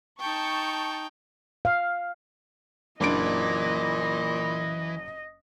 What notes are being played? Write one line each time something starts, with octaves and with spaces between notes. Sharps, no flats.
D#4 G5 A5 C#6
F5
F#1 A#2 E3 D4 D#5 D7